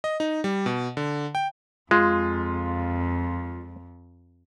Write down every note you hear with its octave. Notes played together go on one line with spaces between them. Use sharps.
D#5
D#4
G3
B2
D3
G5
F2 G#3 F4